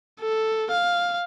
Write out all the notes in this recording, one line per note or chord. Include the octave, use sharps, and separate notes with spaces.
A4
F5